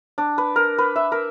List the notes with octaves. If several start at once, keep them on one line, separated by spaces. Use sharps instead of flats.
D4
B4
A#4
B4
E5
A#4